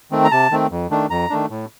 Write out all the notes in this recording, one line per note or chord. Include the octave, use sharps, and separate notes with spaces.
D#3 A3 C4
A#5
C3 A5
D#3 A3 C4
F2
D#3 A3 D4
F2 A#5
D#3 A3 D4
A2